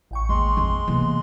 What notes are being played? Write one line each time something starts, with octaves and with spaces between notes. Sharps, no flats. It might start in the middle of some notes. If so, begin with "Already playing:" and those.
A1 G5 C#6
D#2 G#3 C6
F2
C3 E3 A#3 B3